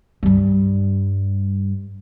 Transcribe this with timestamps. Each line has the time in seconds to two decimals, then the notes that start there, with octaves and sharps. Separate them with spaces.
0.23 G2 G3